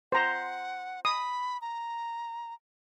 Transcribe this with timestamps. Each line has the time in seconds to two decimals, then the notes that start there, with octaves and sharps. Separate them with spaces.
0.12 C5 F#5 A#5
1.05 B5 D#6
1.61 A#5